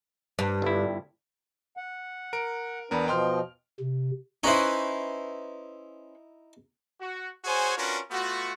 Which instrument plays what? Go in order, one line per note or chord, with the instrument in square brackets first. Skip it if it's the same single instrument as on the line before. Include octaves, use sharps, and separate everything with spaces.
[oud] G2
[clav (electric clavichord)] G1 E4
[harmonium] F#5
[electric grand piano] A#4 D7
[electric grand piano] E2 B3 A#4 [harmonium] D4 B4
[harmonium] B2 F3 D#5 [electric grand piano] G5 C6 F6
[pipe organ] C3
[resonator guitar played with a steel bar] C#4 B4 C5 [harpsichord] D#4 E4
[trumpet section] F#4
F#4 G#4 C5 C#5 G#5
C#4 D4 F4 F#4 A#4 B4
A3 B3 F4 F#4